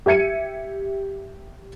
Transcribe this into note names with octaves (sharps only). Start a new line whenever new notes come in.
G4 E5 G#6 C#7 D#7